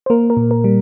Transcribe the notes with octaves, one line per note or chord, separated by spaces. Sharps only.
C5
A#3 A#4
A#4
A#2
A#4
G3